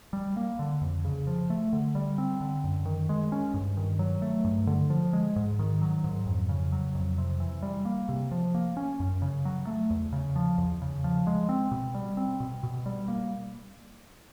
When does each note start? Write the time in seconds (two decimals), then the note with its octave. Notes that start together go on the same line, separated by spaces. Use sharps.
0.13 G3
0.37 A#3
0.59 D3
0.81 F2
1.05 C#3
1.27 F3
1.50 A3
1.73 D3
1.95 G3
2.18 C4
2.41 D3
2.64 F#2
2.86 D#3
3.09 G#3
3.32 C#4
3.54 G2
3.77 D#3
3.99 F#3
4.22 A3
4.44 G2
4.67 D3
4.90 F3
5.13 G#3
5.36 G#2
5.59 D#3
5.81 F#3
6.04 G#2
6.26 F2
6.49 C#3
6.72 F#3
6.95 F2
7.18 C3
7.40 E3
7.62 G3
7.85 A#3
8.09 C3
8.31 F3
8.54 A#3
8.77 C#4
9.00 F#2
9.22 C#3
9.45 F#3
9.67 A3
9.90 E2
10.12 C#3
10.36 F3
10.58 E2
10.82 C#3
11.04 F3
11.27 G#3
11.49 C4
11.72 B2
11.95 G3
12.17 C4
12.40 B2
12.63 B2
12.86 G3
13.08 A#3